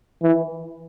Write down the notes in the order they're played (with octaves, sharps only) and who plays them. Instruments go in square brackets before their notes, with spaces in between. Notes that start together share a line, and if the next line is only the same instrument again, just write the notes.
[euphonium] E3